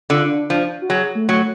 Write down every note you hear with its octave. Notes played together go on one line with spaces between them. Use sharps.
D3 F4
D4
F3 D4
F#4
F#3 G#4
A3
F#3 A3